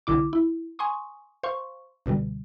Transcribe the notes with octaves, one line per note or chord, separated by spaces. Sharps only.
C2 D3 E4 D6
E4
G#5 C6 C#6 D#6
C5 F5 C6 C#6
C#2 B2 D3 G3